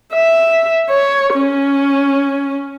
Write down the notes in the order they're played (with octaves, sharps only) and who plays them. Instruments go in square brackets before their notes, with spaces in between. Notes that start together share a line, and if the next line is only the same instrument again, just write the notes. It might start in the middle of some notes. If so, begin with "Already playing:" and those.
[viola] E5
C#5
C#4